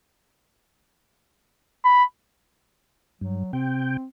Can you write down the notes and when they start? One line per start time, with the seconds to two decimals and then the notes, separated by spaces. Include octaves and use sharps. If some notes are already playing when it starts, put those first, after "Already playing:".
1.85 B5
3.21 G2 F#3
3.53 C3 C4 G5